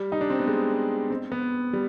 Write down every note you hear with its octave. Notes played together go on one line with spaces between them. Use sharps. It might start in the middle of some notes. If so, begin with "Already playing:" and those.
Already playing: G3
D#4
D4
C4
B3
G#3
C4
B3
G3